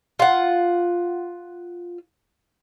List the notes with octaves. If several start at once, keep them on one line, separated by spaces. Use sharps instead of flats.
F4 F#5